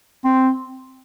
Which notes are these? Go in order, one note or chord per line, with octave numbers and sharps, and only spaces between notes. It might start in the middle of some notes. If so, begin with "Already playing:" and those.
C4